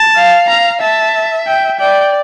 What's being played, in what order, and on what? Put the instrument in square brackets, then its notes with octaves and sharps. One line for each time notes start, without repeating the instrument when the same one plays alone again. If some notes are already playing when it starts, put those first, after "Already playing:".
Already playing: [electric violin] A5
[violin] F5
[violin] F5 [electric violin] A#5
[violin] E5 [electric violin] A5
[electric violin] G5
[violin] D5 [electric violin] G5